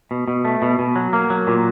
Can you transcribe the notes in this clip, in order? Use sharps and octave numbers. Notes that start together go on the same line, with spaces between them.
B2
B2
A3
B2
B2
F#3
A#3
F#3
A#2